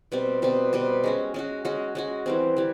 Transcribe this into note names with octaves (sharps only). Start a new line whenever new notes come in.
B2 G3 C4
B2 G3 C4
B2 G3 C4
G#3 C#4 F#4
G#3 C#4 F#4
G#3 C#4 F#4
G#3 C#4 F#4
E3 G3 C4
E3 G3